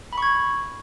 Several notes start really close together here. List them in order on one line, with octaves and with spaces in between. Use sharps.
B5 C#6 G#6